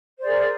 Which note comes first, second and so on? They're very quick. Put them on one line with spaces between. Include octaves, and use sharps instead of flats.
C5 D5 G#4 A#4